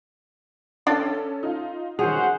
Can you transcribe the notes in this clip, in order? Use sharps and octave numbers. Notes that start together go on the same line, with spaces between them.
C#4 D4 A4 D5 G5
D#4 F4
D#3 C#4 F#4 G#4 C5 F#5 F7